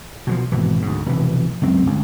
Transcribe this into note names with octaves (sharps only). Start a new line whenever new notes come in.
B2 D3 F3
G#1 B2 E3
D2 G#2
F1 B2 E3
C#2 F#2 C4
G1 C#2